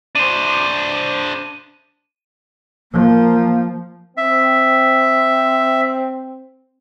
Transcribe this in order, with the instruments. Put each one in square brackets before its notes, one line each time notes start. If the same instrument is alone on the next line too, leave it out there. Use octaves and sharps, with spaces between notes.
[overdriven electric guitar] D4 C5 [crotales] D#7
[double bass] F3 [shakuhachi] A#3
[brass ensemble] C4 [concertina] E5